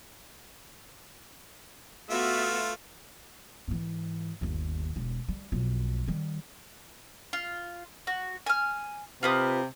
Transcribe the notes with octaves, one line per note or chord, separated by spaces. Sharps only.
A3 B3 F4 F#4 E5
G#2 E3
G1 D#2
E1
G3
B1 F2
D#3 G3
F4
F#4
G#5 F6
C3 F4 B4 D#6